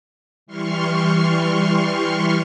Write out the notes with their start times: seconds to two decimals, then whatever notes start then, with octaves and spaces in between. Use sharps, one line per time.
0.46 E3 G3 C6 C#6 F6